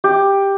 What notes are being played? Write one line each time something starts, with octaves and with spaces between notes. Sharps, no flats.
G4